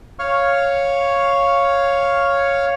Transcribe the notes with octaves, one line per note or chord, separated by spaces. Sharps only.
C#5 F5 C#6 F6